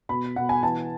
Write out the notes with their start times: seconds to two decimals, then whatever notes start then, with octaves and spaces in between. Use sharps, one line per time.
0.09 B2 B5
0.36 B2 F#5
0.49 G#5
0.63 E3 A5